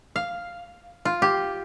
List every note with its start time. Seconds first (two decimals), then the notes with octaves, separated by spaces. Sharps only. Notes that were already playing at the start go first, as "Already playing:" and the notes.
0.16 F5
1.05 F4
1.22 G4